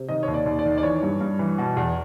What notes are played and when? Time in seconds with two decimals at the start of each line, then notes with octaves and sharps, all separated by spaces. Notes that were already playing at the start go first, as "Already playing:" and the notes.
Already playing: C3
0.09 D#3 D#5
0.23 D#2 C#5
0.34 D5
0.46 D#2
0.59 D5
0.64 D#3
0.78 D5
0.83 E3 C#5
1.03 G2
1.21 G2
1.39 E3
1.58 B2
1.77 E2